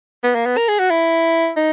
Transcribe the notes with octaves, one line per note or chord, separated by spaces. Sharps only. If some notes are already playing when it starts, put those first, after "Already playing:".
B3
A#3
B3
A#4
G#4
F#4
E4
D#4